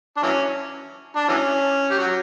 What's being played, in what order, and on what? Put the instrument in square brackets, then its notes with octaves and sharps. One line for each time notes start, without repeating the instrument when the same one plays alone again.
[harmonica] D4
E3 F#3 C#4
D4
E3 F#3 C#4
G4
F#3 F#4